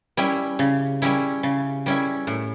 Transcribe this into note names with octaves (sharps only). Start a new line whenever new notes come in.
G3 C#4 E4
C#3
G3 C#4 E4
C#3
G3 C#4 E4
A2